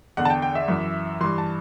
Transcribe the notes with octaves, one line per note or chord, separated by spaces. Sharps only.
E2 D3 F#5
A5
G5
G5
E5
F#2 E3
G2 E3 C6
A5